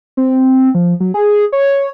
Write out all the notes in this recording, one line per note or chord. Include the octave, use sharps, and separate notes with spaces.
C4
F3
F#3
G#4
C#5